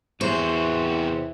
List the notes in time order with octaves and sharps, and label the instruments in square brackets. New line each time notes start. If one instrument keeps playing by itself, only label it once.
[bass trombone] E2 [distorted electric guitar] C3 F#4 [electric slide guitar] B4 E5 [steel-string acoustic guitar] C5